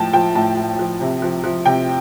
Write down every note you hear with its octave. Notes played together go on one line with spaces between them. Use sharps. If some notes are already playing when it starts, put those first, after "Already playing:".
Already playing: A2 F3 G5 A5
F3 G5
A2 A5
A2
F3
C3
F3
F3
C3 G5